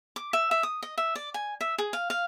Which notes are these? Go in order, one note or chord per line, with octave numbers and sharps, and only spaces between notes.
D6
E5
E5
D#6
D#5
E5
D5
G#5
E5
G#4
F5
F5